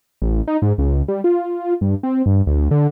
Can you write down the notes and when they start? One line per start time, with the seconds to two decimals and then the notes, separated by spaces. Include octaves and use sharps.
0.22 A1
0.48 D#4
0.62 G#2
0.78 C#2
1.08 G3
1.24 F4
1.81 G2
2.03 C4
2.26 G2
2.47 D2
2.71 D3